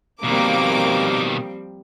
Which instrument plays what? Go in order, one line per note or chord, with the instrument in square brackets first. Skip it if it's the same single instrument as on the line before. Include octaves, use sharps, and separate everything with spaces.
[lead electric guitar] B2 D#3 [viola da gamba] F3 G3 C4 [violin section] A#3 D6